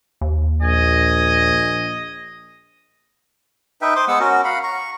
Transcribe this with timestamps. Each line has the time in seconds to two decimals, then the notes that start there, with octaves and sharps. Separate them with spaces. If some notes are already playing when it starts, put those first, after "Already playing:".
0.21 D#2
0.62 A#1 D#5 G#5
3.82 D#4 B4 E5 G5
3.96 C5 C6 D6 D#6
4.08 G#3 B3 F#5 E6
4.20 C#4 F#4 A#4
4.44 F5 F#5 B5
4.63 A#5 C#6